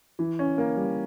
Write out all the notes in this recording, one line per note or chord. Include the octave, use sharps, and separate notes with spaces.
E3
C#4
A#3
G3